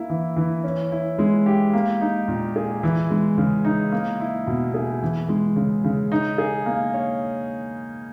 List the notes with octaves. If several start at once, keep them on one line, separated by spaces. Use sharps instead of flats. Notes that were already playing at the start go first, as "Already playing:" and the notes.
Already playing: A#3 E4
E3
E3
C#4
E4
G#3
G4
A#3
D#4
A#2
G#4
E3
G#3
C#3
D#4
A#3
E4
B2
G#4
E3
G#3
C#3
C#3
D#4
G#4
A#3
C#5